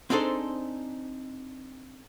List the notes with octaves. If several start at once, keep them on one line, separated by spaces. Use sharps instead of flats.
C4 D4 D#4 G#4 A4 C5